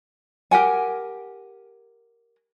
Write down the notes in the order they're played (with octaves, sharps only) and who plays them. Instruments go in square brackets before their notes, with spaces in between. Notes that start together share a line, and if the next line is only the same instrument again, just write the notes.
[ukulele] G4 A#4 F#5 G#5